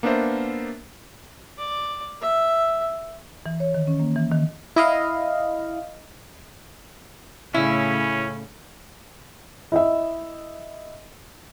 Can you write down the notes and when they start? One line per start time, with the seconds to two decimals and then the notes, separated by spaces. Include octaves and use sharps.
0.03 A#3 B3 D4 A#4 C5 E5
1.58 D5
2.21 E5
3.46 E3
3.60 C#5
3.74 D#3
3.87 C#4
4.00 A#3
4.16 E3
4.32 D#3
4.76 E4 D#5 F5
7.54 A2 C#3 A3 C#4 E4
9.72 E4 D#5 E5